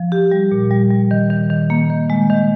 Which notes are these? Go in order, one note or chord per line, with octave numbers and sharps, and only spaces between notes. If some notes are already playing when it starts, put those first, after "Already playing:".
Already playing: F3
G4
G3
A#2
G3
G3
D#3
D#3
D#3
A#3
D#3
G#3
D#3